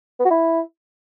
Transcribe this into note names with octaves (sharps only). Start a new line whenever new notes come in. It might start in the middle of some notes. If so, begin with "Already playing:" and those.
B3
F#4
E4